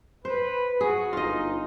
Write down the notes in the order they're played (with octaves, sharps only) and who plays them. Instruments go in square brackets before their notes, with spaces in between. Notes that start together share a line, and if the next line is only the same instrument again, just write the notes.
[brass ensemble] B4 [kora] C5
[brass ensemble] F#4 [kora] G#4
[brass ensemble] G1 D#4 [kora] F4 D#5